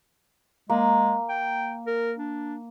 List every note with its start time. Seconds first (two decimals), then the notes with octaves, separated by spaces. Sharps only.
0.70 G#3 A#3
1.29 G5
1.87 A#4
2.18 D4